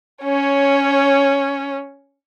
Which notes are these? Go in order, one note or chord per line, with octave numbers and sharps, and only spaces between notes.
C#4 C#5